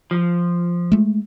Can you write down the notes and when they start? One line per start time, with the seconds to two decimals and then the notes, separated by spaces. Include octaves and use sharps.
0.11 F3
0.92 G#3 A3